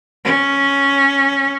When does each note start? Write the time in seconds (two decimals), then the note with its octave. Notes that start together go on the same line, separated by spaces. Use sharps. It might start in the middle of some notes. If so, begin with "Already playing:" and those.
0.25 C#4